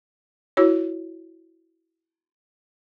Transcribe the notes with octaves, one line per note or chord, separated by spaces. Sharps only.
E4 F#4 C#5